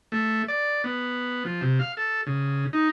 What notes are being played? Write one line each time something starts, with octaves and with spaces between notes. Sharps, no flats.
A3
D5
B3
F3
C3
F5
A4
C#3
D#4